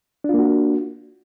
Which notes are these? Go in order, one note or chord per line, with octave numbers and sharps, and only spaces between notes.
A#3 D4 F4 F#4